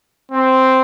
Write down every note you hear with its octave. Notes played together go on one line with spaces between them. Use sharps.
C4